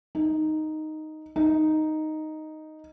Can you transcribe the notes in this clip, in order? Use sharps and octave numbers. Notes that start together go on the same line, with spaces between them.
D#4
D#4